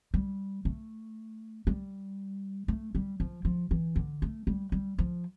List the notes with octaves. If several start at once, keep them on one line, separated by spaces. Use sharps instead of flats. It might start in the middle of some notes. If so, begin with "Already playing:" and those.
G3
A3
G3
A3
G3
F3
F3
E3
D3
A3
G3
G3
F3